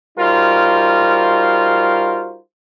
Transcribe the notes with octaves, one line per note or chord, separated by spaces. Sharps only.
G3 D#4 F4 F#4 A#4 C5